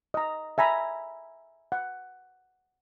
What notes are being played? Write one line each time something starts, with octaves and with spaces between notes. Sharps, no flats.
D#5 A#5
E5 G#5 A#5 B5
F#5